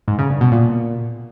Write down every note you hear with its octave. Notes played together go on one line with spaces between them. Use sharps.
G#2
C#3
G2
B2
A#2